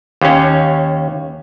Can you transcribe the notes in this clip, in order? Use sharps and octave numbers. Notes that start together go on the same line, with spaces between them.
D#2 C#4